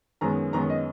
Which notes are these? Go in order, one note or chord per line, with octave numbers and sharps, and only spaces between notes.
F#2 D#3 G#3 B3 A#5
F#2 D#3 G#3 B3 A#5
D#5